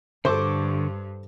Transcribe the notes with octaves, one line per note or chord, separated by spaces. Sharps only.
G2 D3 A4 C5 C#6 D6